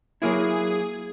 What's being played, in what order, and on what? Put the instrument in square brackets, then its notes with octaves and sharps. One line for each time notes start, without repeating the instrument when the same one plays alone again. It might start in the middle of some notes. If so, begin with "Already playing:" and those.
[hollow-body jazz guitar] F#3 A#3 E4 [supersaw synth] G#4